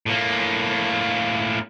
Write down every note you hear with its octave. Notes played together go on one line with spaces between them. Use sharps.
A2 A#3